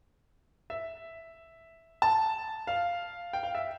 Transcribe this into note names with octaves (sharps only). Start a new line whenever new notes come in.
E5
A5
F5
G5
F5
E5